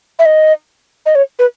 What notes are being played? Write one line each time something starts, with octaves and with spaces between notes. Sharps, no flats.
E5
D#5
D#5
C#5
B4